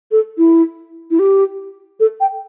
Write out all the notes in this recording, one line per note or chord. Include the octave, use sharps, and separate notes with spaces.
A4
E4
E4
G4
A4
G5